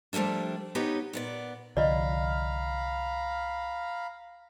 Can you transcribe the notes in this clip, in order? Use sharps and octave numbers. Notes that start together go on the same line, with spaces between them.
F3 G3 A3 A#3 D4
B3 D#4 G4 B4 C#5
A#2 B3 D5
C2 D3 F3 D5 D#5 F5 A#5 B5